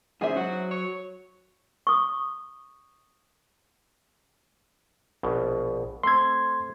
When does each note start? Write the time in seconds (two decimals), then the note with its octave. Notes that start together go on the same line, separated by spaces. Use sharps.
0.21 G#2 C#3 G#4 C5 E5
0.36 F#3 F#4
0.71 C#5
1.87 C#6 D#6
5.23 A#1 B2
6.03 A3 C4 C6 G#6